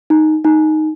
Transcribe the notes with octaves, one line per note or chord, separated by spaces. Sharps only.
D#4
D#4